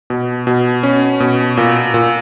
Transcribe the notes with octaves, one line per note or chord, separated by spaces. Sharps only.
B2
B2
C#4
B2
A#2
A#2